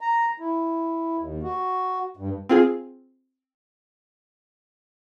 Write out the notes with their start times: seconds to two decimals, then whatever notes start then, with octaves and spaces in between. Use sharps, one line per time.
0.01 A#5
0.40 E4
1.19 D#2
1.43 F#4
2.17 G2
2.49 C4 F4 G#4